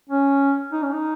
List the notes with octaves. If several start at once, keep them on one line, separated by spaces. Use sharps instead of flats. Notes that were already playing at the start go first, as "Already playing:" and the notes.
C#4
D#4
C#4
D#4